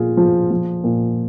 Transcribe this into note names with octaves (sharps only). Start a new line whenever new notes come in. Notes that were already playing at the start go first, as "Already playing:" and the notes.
Already playing: A#2 F3 F4 G#4
F3
F3
A#2